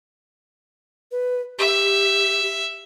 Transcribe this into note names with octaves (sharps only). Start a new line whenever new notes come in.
B4
G4 E5